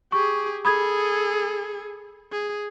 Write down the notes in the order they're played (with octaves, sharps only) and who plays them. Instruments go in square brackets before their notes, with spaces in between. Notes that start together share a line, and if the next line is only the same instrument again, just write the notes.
[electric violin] G4 G#4 [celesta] C#6
[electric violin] G#4 A4 [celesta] B5 D#6 G#6
[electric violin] G#4